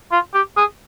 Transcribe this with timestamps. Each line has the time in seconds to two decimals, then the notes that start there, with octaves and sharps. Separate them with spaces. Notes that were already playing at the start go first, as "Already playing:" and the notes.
0.12 F4
0.34 G4
0.57 G#4